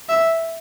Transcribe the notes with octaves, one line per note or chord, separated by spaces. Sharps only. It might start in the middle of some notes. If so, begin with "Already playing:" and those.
E5